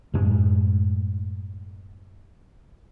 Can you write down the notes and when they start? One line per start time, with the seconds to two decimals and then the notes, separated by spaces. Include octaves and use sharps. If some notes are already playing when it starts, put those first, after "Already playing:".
0.14 F#2 A2 G#3